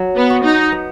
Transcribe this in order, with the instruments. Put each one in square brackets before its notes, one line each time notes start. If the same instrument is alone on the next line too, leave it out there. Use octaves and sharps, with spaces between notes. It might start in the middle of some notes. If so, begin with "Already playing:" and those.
Already playing: [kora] F#3
[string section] B3
[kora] F#4
[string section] D#4
[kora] B3